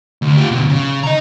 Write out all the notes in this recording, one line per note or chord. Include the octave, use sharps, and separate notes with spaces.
D2
F4 G4
D2 B2
C#3
D#5 A#5